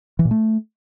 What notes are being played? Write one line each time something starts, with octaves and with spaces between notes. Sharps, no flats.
E3
A#2
A3